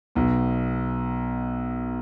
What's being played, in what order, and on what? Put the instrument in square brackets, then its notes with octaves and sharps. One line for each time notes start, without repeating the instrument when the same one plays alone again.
[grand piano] B1 B2